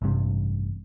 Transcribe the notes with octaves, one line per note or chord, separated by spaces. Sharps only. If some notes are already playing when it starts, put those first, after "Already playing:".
A1 G2 C3